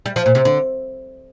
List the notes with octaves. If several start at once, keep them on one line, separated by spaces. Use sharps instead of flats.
G3
F3
A#2
C3
D3